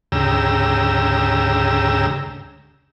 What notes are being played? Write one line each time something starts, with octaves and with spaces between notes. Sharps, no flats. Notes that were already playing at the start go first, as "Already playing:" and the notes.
D2 G#2 C#3 G4 A#5 E6